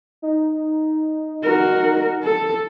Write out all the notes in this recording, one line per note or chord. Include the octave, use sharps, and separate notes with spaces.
D#4
F#4 A#4
A4